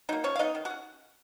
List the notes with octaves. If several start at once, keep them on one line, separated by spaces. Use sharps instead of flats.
F#3 A#3 D#4
F3 C#4 C#5
F5
G#3 B3 D#4 D#5
D#3
F#4 F#5
C#4